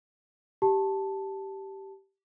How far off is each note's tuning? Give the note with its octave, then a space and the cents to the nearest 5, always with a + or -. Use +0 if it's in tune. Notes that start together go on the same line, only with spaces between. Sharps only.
G4 -10 A5 +0